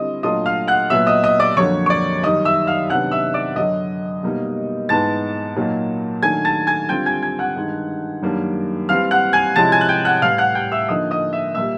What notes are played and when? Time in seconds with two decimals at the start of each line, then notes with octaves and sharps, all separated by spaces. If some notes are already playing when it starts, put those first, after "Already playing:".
Already playing: D3 G3 C4 E4 D#5 D#6
0.23 A#2 F#3 A3 D4 F4 D#5 D#6
0.46 F5 F6
0.68 F#5 F#6
0.90 A#2 F#3 B3 E5 E6
1.07 D#5 D#6
1.24 D#5 D#6
1.40 D5 D6
1.57 F2 D3 F#3 A#3 C#5 C#6
1.86 C#6
1.90 D5 D6
2.23 F#2 D#3 G3 D#5 D#6
2.45 E5 E6
2.67 F5 F6
2.90 C3 D#3 F#3 B3 D4 F#5 F#6
3.11 E5 E6
3.34 D5 D6
3.56 F#2 D3 F#3 D#5 D#6
4.23 B2 G3 A#3 D#4
4.89 G#2 E3 G#3 B3 A5 A6
5.56 A#2 F#3 A#3 D#4
6.23 D#3 F#3 A3 D4 G#5 G#6
6.45 A5 A6
6.67 G#5 G#6
6.89 D3 G3 C4 F4 G5 G6
7.06 G#5 G#6
7.23 G#5 G#6
7.39 F#5 F#6
7.56 G2 D#3 G#3
8.22 F#2 D#3 G3 A#3 D4
8.89 E3 G3 C4 F5 F6
9.11 F#5 F#6
9.33 G#5 G#6
9.56 C3 F3 G#3 C#4 E4 A5 A6
9.72 G#5 G#6
9.81 F#6
9.89 G5 G6
10.05 F#5 F#6
10.22 A2 E3 G3 F5 F6
10.38 F#5 F#6
10.55 G5 G6
10.72 E5 E6
10.89 D3 F3 A#3 D#4 D#5 D#6
11.11 D#5 D#6
11.33 E5 E6
11.55 A#2 G3 A#3 E5 E6